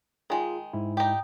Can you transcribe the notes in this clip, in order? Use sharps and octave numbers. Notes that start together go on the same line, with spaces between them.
D#3 G#3 F4 G#4
G#2 E4
D#4 G4